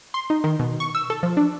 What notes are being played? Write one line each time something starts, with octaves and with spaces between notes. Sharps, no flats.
C6
D#4
D#3
B2
C#6
E6
A4
F3
D4